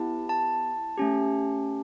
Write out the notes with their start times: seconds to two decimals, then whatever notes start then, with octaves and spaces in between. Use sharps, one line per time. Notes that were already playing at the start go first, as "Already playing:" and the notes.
Already playing: B3 E4 G4 A5
0.29 A5
0.97 A3 C#4 G4